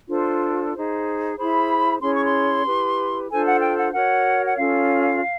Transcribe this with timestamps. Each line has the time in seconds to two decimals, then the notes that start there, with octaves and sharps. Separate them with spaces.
0.09 D4 F4 A4 C5
0.74 D#4 G#4 C5
1.36 E4 G#4 C5 B5
2.01 C#4 E4 G#4 C#5 C6
2.13 C#6
2.25 C6
2.65 E4 G4 B4
3.29 D4 F4 A4 C5 G#5
3.45 F#5
3.61 G5
3.77 F#5
3.92 F#4 A#4 C#5 F#5
4.46 F#5
4.56 C#4 F4 A4 F5